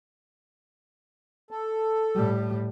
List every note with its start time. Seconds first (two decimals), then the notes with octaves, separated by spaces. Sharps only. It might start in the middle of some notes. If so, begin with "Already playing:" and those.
1.51 A4
2.15 A2 G3